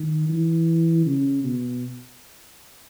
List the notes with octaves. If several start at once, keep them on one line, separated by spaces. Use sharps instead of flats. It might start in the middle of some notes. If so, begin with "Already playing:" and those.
Already playing: D#3
E3
C#3
B2